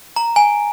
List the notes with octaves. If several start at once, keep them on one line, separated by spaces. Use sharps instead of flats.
A#5
G#5